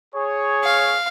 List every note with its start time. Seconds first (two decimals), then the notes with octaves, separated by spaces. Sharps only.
0.15 G#4 C#5
0.64 F5